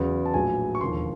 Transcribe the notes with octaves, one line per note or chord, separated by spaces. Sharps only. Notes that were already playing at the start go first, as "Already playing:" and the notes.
Already playing: E2 C#3 F#3
A5
A#1 A2 F#3 G#5
C#6
E1 D#2 D3 F3 C6